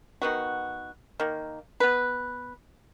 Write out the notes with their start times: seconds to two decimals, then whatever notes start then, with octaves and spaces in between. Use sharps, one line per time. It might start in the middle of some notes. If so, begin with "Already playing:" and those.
0.22 D#3 B3 F#4
1.20 D#3 A#3
1.80 B3 B4